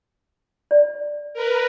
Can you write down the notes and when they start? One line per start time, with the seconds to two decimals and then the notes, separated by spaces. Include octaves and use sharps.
0.71 D5
1.34 A#4 B4